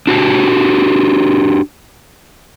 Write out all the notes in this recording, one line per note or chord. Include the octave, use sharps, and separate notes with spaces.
D4 F#4 G4 A5